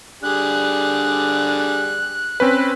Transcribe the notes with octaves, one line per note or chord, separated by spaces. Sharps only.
D3 G3 G#4 F#6
C4 C#4 B4